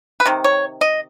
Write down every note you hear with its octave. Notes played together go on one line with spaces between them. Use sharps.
B4
C3 D#3
C#5
D#5